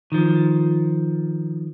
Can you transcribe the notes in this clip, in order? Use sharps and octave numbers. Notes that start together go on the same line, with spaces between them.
D#3 F3